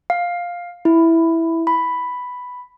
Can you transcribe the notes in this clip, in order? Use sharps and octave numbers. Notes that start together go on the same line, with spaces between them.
F5
E4
B5